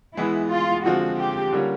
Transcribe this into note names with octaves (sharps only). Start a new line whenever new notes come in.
E3 G#3 B3 E4
F4
D3 F3 G#3 C4 F4 F#4
G4
D3 G3 A#3 C#4 F4